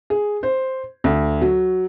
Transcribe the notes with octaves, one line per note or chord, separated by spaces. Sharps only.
G#4
C5
D2
F#3